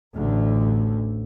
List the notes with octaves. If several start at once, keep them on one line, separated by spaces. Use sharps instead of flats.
A1 D2 D3